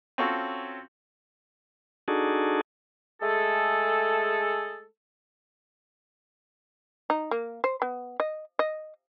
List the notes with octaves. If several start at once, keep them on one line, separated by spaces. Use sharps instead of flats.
C4 C#4 F4 F#4 A4 C#5
D4 D#4 F#4 G#4 A4
G#3 A3 G#4 A4
D#4
A#3
C5
B3
D#5
D#5